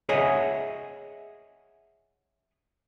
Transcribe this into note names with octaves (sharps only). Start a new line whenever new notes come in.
G#4 C#5 D#5 E5 F#5 G#5